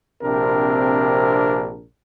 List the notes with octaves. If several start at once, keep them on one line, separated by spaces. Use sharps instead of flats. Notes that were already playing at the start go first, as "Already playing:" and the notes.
A#1 C3 C4 D4 A#4